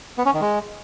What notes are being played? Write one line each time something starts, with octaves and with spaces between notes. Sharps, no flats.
B3
C#4
D#3
G#3